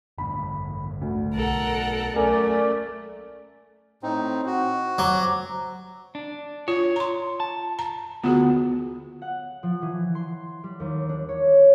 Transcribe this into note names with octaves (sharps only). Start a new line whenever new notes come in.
A1 G2 D3 B5
D2
B1 A4 A#4 F#5
F#3 A3 C#4 A4 A#4 D5 G#5
A2 C4 D#4
F#4
F#3 C5 D6
D4
F4 C#5
A#5 C6
A5
A#5
D2 B3 F4 F#4 G#4
F#5
F3
E3
C6
G3
D#2
D4
C#5